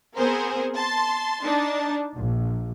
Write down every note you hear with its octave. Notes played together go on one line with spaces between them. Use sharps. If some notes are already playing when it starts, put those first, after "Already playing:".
B3 C4 G#4 A#4 C5
A5 C6
D4 D#4 A5
A#1